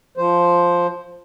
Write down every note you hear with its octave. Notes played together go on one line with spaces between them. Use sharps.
F3 C5